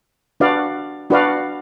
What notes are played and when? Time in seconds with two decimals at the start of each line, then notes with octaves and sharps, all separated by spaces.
0.40 D4 F#4 B4 D5 F5
1.10 D4 F#4 B4 D5 F5